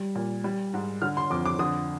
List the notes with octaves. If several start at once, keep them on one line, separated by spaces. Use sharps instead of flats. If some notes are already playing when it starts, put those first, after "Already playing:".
Already playing: G3
A#2
G3
G#2
D3 F6
C6
F2 D6
D6
D3 D#6